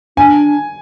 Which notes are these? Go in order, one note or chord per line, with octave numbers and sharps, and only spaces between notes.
D4 G#5